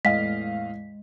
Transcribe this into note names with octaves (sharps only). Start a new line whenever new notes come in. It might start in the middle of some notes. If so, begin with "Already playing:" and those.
E2 A2 E3 G#3 D#5 F5 B6